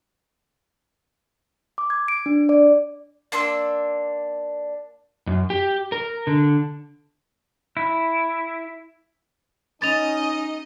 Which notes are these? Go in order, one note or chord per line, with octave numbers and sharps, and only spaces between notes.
D6
G#6
D7
D4
D5
A#3 D4 C6 E6
F#2
G4
A#4
D3
E4
C#4 D#4 D#5 A6 F7